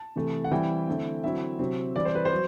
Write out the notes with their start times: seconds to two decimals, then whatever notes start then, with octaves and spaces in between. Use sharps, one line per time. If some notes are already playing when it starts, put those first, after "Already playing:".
Already playing: A5
0.16 C3 E3 A3
0.44 F#5
0.51 E3 G3 C4 E4 G5
0.87 D3 A3 C4 E4
1.24 D3 F#3 C4 E4 E5
1.59 C3 F#3 C4
1.96 E3 G3 C4 D5
2.05 C5
2.15 B4
2.25 C5
2.32 F#3